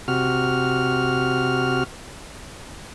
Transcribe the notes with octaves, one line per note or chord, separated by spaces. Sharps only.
C3 F#4 F6